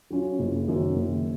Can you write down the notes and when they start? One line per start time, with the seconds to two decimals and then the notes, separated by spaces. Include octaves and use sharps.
0.10 F#3 C#4 F4
0.39 F#1
0.68 F#2 D#3
0.96 F#1